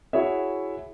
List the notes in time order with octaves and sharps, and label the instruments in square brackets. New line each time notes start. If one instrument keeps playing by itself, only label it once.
[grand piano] E4 F#4 G#4 C#5 E5